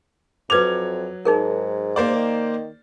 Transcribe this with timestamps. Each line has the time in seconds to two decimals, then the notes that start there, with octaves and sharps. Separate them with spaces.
0.50 F2 F#3 B4 D6 G#6 F7
1.25 G#2 D#4 G#4 A#4
1.96 A#3 C5 D5
2.15 D#3